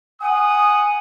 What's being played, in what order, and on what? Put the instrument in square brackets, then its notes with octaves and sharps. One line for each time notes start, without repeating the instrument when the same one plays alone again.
[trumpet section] F#5 D#6 [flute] G#5